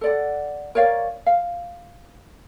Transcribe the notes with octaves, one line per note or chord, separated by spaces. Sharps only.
A4 D5 F#5
A#4 C#5 D5 F5
F5